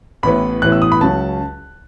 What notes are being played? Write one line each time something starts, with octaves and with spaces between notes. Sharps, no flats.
A1 A2 E3 B3 B5
A1 A2 E3 B3 F#6
E6
D#6
B5
C#2 C#3 F#3 C#4 A5